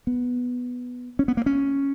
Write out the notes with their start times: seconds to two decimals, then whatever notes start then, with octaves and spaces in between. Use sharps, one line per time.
0.07 B3
1.19 C#4
1.28 B3
1.37 A#3
1.46 C#4